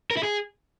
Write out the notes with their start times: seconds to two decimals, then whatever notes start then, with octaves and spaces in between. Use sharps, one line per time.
0.11 A#4
0.17 E4
0.23 G#4